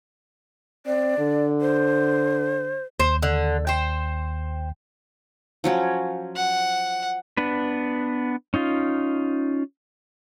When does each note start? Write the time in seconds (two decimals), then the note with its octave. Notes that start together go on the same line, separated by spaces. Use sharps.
0.86 C4 D5
1.18 D3
1.61 C5
3.00 D#2 C5
3.23 D3
3.67 C5 G5
5.64 F3 F#3 C#4
6.36 F#5
7.37 B3 D4 B4
8.54 C#4 D#4 F4